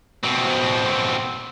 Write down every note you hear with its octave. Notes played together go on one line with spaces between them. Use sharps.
B2 C4